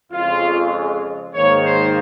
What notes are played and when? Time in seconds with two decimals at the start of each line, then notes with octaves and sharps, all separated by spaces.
0.12 F2 C#3 G#3 F4
1.34 G#2 D#3 A#3 C#5
1.64 C5